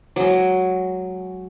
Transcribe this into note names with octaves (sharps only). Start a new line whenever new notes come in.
F#3 G#3